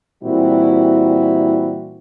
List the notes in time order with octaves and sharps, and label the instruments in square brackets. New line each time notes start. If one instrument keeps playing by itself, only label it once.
[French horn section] A#2 E3 G3 C4 E4 F#4